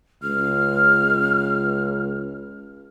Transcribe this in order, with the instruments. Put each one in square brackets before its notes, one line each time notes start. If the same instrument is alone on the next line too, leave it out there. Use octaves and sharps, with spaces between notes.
[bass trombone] C#2 [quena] F6